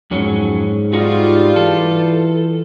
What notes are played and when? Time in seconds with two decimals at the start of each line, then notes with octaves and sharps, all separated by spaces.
0.11 F2 G#2 F#3 C#4
0.93 G3 D#4 F4 F#4
1.56 E3 A4